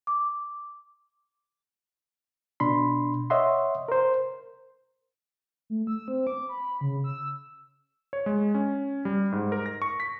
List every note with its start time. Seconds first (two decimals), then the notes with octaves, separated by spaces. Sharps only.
0.07 D6
2.60 B2 D4 B5 C6
3.30 C#5 D#5 E5 F#5 C6
3.88 A#4 C5
5.70 A3
5.87 E6
6.08 C4
6.27 D6
6.49 B5
6.81 C#3
7.04 E6
8.13 C#5
8.26 G#3
8.54 C#4
9.05 G3
9.32 G#2
9.52 A#4
9.66 A#6
9.82 C#6
10.00 B6